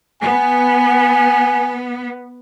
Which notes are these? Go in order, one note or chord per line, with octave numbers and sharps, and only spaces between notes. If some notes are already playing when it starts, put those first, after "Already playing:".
B3 G#5